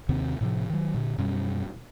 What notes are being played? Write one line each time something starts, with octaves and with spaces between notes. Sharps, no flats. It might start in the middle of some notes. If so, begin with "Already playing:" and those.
D#2 C3 D#3 C4
A2 C3 F3
D#3 F#3
A#2 D3
F#2 B2 G3 C#4